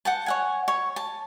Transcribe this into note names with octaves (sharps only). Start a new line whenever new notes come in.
F#5 G5 A5
C#5 F#5 G#5
C#5
A5